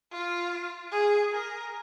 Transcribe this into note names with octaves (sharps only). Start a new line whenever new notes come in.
F4
G#4
A#4